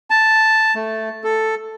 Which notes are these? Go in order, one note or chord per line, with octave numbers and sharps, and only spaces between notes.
A5
A3
A4